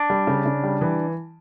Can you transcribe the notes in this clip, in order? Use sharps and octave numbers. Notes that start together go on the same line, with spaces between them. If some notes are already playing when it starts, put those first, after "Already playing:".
Already playing: D4
G3
C#3
C#3
G3
E3